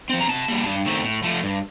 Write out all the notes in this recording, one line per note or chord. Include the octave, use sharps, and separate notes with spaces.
F3 C4
A#5
C3 A5
G3 A#3
G2
D#3 A3 C4
A2
F3 A3
G2